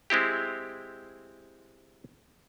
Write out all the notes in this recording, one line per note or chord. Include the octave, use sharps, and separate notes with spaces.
G#3 C4 E4 G4